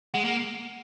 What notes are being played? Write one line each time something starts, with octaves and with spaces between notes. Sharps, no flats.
G#3 F#5
A#3